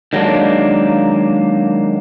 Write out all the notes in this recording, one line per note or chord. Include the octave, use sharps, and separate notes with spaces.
D#3 F#3 G#3 A#3 D4